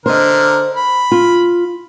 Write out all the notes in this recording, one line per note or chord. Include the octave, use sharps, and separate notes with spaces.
D3 A#4 C5 D#5
B5
F4